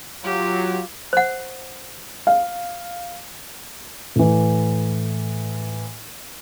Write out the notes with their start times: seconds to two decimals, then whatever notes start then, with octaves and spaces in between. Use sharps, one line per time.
0.24 F#3 F4 G4
1.13 C5 F#5
2.27 F5
4.16 A2 E3